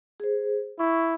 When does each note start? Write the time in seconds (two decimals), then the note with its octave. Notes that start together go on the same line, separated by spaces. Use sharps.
0.20 G#4 C5
0.79 E4 C#6